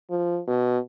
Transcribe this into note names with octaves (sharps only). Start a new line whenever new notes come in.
F3
B2